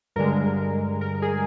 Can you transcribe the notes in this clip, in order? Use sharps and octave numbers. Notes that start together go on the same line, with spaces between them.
G2 D3 G#3 A#4
A#4
G#4